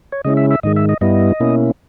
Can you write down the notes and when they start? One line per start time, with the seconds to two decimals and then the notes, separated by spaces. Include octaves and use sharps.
0.12 C#5
0.25 C#3 G#3 C#4 E4 D#5
0.37 E5
0.51 E5
0.63 G#2 D#3 G#3 D#5
0.76 E5
0.89 D#5
1.01 G2 G3 B3 E4 D#5
1.40 B2 A#3 C#4 E4